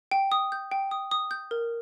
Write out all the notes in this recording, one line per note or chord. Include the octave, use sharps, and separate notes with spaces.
G5
D#6
G6
G5
D#6
D#6
G6
A#4